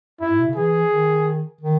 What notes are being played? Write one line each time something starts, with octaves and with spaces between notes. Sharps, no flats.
F#2 E4
G#2
B2
C#3
E3 G#4
D#3
D#3